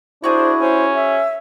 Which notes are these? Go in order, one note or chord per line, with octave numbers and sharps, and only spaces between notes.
D4 E4 F#4 G#4 C5
C#4 C5
E5